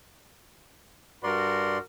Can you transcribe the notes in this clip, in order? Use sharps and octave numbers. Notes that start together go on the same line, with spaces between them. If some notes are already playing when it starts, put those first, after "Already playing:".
G2 F#4 A#4 D5 C6